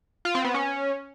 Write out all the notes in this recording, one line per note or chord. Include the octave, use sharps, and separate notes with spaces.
F4
C4
B3
C#4